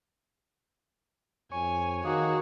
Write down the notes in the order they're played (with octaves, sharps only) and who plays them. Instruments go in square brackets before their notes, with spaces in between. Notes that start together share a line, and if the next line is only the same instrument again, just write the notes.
[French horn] F2 [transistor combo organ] C#5 [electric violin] G#5
[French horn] D#3 [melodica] A#3 G#4 [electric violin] F#4